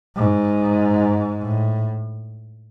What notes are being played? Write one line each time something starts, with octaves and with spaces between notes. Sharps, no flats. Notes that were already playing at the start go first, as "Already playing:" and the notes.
G#2
A2